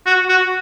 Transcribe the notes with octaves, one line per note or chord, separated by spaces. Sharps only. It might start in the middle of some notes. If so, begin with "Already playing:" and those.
F#4
F#4